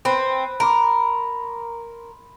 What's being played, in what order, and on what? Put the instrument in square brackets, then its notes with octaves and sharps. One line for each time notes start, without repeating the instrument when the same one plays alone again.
[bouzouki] C4 [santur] B4
[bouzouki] A#4 [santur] B5 C6 D6